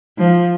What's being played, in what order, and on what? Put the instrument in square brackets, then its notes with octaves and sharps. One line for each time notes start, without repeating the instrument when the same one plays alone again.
[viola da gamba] F3